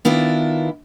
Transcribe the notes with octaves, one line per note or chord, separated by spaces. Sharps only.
D#3 B3 D4 E4 F4